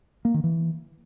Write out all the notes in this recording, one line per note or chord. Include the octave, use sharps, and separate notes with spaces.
A#3
D#3
E3